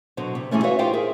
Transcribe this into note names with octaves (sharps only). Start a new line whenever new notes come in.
B2 D3 F#3 C5
C3
C3 E3 G#3 A3 C#4
F#4 A4 B4 C#5 E5 F5
D#4 F4 G4 C5 F5 G5
G#4 A#4 E5